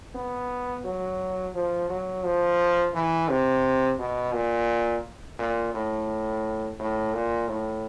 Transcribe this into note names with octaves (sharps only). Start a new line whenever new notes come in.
B3
F#3
F3
F#3
F3
E3
C3
B2
A#2
A#2
A2
A2
A#2
A2